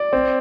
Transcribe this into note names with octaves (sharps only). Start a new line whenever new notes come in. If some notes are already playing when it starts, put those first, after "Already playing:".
Already playing: D5
C4